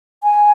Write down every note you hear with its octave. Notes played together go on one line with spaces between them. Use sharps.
G#5